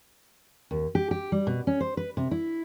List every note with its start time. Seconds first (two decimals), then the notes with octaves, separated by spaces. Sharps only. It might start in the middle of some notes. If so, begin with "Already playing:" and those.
0.71 D#2
0.95 G4
1.11 G4
1.32 G3
1.47 B2
1.67 C#4
1.81 C5
1.97 B4
2.17 C3
2.31 E4